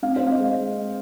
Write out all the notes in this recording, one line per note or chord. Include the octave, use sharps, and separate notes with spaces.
C4 F5
C5
C4
F5
D#5
G#3